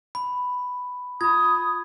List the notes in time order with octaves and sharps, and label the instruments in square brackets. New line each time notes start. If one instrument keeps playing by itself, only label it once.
[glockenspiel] B5
[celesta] F4 B5 [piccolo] D#6 [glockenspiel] G#6